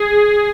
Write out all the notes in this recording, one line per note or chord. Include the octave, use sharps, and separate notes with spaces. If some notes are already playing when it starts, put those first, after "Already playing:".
Already playing: G#4